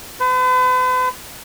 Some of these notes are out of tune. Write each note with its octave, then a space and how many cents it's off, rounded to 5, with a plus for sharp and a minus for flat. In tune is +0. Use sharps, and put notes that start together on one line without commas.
B4 +45